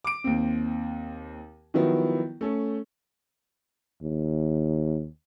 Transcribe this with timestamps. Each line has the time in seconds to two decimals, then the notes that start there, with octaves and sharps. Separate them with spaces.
0.04 D6 D7
0.24 D#2 C4
1.74 D#3 F3 F#3 B3 E4
2.41 A3 C#4 A4
4.03 D#2